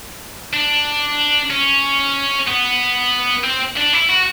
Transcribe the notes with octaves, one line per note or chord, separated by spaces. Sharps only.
D4
C#4
B3
C4
D4
E4
F#4